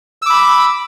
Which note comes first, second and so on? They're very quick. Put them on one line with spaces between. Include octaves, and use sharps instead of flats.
E6 D6 B5